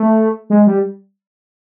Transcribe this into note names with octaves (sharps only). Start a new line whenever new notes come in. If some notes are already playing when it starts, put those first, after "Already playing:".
Already playing: A3
G#3
G3